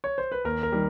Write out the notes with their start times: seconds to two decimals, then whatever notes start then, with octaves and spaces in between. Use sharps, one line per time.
0.04 C#5
0.18 C5
0.32 B4
0.44 D#2 A#4
0.63 A#4
0.72 D#3 G3